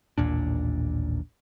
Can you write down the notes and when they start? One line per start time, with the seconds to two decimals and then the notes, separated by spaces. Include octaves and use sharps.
0.18 A1 D#2 A#2 D4